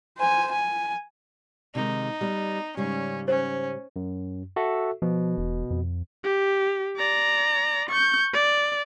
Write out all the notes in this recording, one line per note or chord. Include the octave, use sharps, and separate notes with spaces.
C5 G#5
G#5
C3 D#3 G#3 D#4
G3 B3
G#2 C#3 G3 C#4
C#4 C5
F#2
F#4 A4 E5
B2 F3
E1
F2
G4
D5 A#5
C#6 G6
D5